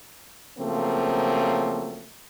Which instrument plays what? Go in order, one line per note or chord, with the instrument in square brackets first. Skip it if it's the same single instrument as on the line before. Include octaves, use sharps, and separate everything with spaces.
[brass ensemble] C#3 F3 F#3 A3 A#3 C4